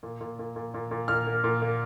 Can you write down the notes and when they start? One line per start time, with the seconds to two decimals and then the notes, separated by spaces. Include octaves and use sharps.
0.03 A#2
0.21 A#2
0.39 A#2
0.56 A#2
0.74 A#2
0.91 A#2
1.08 A#2 F6
1.27 A#3
1.44 A#2
1.62 A#3